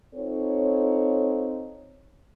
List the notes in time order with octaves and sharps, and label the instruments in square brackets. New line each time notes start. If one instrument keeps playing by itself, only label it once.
[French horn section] C4 D#4 F4 A4 C#5